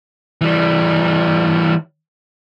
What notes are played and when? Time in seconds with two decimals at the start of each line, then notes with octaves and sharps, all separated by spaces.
0.41 E3 G3